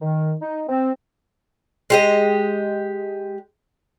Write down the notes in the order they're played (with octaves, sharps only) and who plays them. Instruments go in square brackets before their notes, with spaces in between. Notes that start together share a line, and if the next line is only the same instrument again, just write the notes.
[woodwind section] D#3
D#4
C4
[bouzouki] G#3 G4 D#5